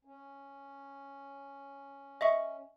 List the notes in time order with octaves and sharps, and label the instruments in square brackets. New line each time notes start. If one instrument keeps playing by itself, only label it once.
[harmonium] C#4
[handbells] D#5 E5 C#6